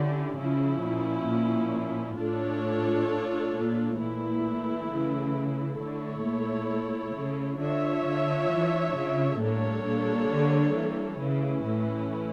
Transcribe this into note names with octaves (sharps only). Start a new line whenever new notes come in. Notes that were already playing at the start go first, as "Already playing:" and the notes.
Already playing: D3 C#4 E4 G4 D5
C#3 F3 C#4 E4
A#2
A#2
A2 D4 F4 A4 C#5
A#2
A#2 E3 A3 E4
C#3
D3 A3 E4 A4 C#5
A#2
C#3
D3 D4 F4 C#5 E5
D3
E3
C#3
A2 G3 A#3 D4 A4 C#5
A#2
D3
E3
C#3 E3 A3 C#4 E4
A2